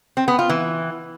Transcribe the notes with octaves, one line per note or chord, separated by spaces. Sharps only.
C4
B3
F4
E3